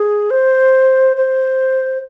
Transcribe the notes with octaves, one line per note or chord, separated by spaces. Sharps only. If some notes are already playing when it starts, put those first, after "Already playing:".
Already playing: G#4
C5
C5